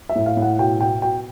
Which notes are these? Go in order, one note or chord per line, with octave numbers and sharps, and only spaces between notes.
E5
A2
F5
A2
F#5
B2 G5
B2 G5
B2 G5